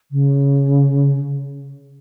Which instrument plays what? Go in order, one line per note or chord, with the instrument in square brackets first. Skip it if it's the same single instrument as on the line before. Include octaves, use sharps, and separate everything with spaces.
[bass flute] C#3